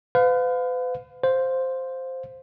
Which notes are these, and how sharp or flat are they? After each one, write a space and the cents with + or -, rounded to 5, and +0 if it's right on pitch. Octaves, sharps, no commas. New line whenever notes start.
B4 +40 F5 +25
C5 +0 F5 +10